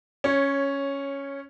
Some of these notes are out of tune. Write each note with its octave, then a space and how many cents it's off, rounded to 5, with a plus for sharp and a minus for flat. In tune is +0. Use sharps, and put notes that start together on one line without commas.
C#4 +0 C#5 -15